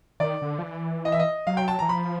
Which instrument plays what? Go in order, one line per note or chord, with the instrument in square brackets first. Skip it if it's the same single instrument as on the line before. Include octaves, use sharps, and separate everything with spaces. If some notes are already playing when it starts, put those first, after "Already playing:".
[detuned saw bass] D#3 [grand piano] D5
[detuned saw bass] D3
F3
E3
[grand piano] D#5
E5
D#5
[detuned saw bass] F#3 [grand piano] F5
[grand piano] G5
A5
[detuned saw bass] E3 [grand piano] A#5
[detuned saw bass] F3 [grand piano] B5